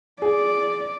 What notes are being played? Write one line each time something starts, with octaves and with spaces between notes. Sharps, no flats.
G#4 D5